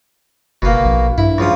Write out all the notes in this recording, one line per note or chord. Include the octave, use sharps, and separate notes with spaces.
F#1 B2 A#3
A#1
G2 E4
C#2 F3 D#6